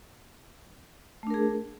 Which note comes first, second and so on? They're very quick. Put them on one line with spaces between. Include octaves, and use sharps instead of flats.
A3 D4 A#4 G#4